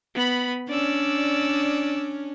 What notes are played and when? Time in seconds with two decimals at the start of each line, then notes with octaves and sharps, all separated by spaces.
0.15 B3 B5
0.69 C#4 D4 D5 E6